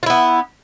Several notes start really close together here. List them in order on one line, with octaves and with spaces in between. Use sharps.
F4 E4 B3